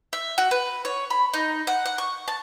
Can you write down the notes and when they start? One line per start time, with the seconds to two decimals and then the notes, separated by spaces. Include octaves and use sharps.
0.13 E5
0.38 F#4
0.51 B4
0.85 C#5
1.10 B5
1.34 D#4
1.67 F#5
1.86 F#5
1.98 C#6
2.28 A5